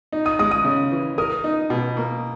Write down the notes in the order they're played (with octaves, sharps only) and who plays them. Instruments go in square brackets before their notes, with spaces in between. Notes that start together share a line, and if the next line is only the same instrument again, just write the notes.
[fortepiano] D#4
[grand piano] D#6
[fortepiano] G#3 [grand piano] D#6
[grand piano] D#6
[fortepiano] C#3
E3
[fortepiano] A#4 [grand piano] D#6
[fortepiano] D#4
B2
A#3